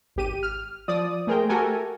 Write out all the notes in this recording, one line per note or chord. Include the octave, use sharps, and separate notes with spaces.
G#1 G4 D#7
F6
F3 D5 D#6
A3 G#4 A#4 C5 G5
A3 F#4 G4 A4 A#4 G#5